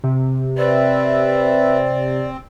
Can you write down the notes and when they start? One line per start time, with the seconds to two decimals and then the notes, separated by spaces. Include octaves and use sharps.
0.04 C3
0.57 C4 B4 D5 E5